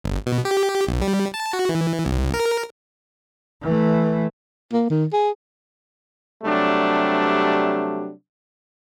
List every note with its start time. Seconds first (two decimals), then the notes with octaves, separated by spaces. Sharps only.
0.04 G1
0.26 B2
0.45 G4
0.87 B1
1.02 G3
1.34 A5
1.53 F#4
1.69 E3
2.06 C2
2.34 A#4
3.63 E3 A3
4.73 A#3
4.90 D#3
5.13 G#4
6.44 C3 F#3 G3 A3 D4